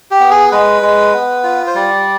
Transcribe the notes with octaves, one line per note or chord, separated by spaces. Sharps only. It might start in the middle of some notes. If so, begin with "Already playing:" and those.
G4
B3
G#4
G#3 B4
G#3
B3
F4
C5
G3 D5